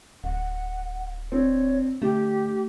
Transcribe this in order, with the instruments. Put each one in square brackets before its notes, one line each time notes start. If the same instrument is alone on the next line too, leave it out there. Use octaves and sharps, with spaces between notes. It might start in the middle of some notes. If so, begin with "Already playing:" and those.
[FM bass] D1 [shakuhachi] F#5
[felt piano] C4 D4 [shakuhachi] C#5
[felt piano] D3 [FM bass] A3 [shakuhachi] G4